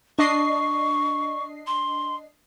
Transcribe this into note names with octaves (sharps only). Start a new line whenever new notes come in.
D4 D#5 C#6 C7
C6